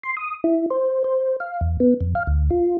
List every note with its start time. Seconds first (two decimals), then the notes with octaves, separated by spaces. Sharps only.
0.04 C6
0.17 D#6
0.44 E4
0.70 C5
1.04 C5
1.40 F5
1.61 E2
1.80 B3
2.01 F2
2.15 F5
2.27 D2
2.50 F4